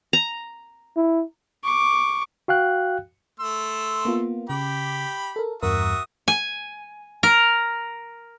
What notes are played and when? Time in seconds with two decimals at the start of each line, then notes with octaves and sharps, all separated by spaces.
0.13 A#5
0.97 E4
1.64 C#6 D6
2.48 F#4 F5 G5 F#6
3.40 A3 C6 E6
4.05 A#3 B3 F4
4.50 C#3 G4 B5 D6
5.36 A4 A#4
5.63 E2 G2 F#4 A#4 E5 D#6
6.28 G#5
7.23 A#4